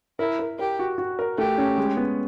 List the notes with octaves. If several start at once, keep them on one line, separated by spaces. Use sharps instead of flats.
E4 A#4
A#4
G4 A#4
F#4
F#4
A#4
A3 G4
C#4
G#3
B3